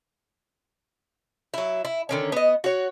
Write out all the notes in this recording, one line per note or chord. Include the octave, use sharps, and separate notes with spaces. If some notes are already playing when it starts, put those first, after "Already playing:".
F#3 E4
E4
D3 D#3 C#4
B3 D#5
F#4 C#5